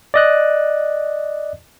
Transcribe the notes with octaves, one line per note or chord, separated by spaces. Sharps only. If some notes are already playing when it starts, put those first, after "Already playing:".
D5 D#5 F#6